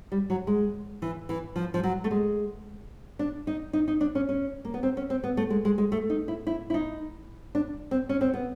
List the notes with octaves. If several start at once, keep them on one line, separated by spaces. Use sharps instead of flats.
G3
F#3
G#3
E3
E3
F3
F3
F#3
A3
G#3
D4
D#4
D#4
D#4
D4
C#4
C#4
A#3
B3
C4
C#4
C4
B3
A3
G#3
G#3
G#3
A3
D#4
E4
E4
E4
D#4
D4
C4
C#4
C4
B3